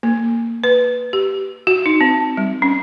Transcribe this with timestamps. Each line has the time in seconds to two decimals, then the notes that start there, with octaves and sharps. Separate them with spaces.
0.03 A#3
0.64 B4
1.13 G4
1.67 F#4
1.86 D#4
2.01 C4
2.37 G3
2.62 C#4